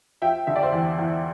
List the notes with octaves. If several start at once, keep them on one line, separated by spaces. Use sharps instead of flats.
F3 E5 G5
D3 E5
D5
C5 E5
E2
E2